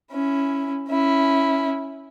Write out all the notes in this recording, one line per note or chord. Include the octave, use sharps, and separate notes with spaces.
C#4 E4
C#4 E4